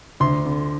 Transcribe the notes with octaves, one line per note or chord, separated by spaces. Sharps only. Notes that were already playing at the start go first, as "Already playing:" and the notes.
D2 C6
D3